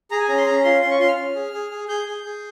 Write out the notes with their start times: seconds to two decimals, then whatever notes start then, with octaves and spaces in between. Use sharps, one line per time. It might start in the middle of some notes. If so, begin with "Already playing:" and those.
0.11 G#4 A#5
0.20 G#5
0.29 C#4 A#5
0.37 C6
0.46 C#4 A#5
0.64 F4 C6
0.82 C#4 C6
0.91 C#6
0.99 F4 C6
1.08 F6
1.17 C#4
1.35 G#4
1.53 G#4
1.71 G#4
1.88 G#4 G6
2.06 G#4
2.24 G#4